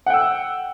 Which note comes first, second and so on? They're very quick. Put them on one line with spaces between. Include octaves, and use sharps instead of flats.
F#5 G5 E6